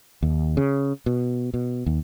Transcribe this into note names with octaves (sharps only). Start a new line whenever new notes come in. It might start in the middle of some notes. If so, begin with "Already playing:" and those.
D#2
C#3
B2
B2
D#2